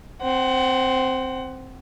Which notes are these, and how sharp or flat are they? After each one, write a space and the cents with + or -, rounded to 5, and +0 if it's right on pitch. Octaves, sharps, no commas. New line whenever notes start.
C4 +0 F#5 +25